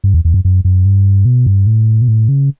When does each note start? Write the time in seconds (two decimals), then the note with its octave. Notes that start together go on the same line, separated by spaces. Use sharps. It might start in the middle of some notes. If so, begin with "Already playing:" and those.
0.04 G2
0.14 E2
0.25 E2
0.34 F#2
0.45 F#2
0.65 F#2
0.85 G2
1.25 B2
1.46 G2
1.67 A2
2.01 B2
2.08 A2
2.28 C#3